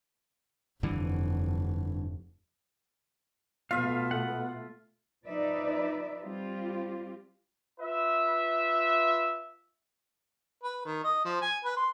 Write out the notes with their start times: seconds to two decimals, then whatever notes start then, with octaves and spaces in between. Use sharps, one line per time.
0.83 F1 G2 D3 E3
3.71 B2 A3 B3 F4 E5 F5
4.11 F#5
5.25 F3 D#4 B4 D5 E5
6.22 G3 C4 F4 G4
7.81 F4 B4 E5
10.63 B4
10.85 D#3
11.04 D#5
11.25 F3
11.42 G#5
11.65 B4
11.77 C6